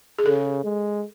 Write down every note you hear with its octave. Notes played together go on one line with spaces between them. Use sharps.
G#4
C#3 A4
G#3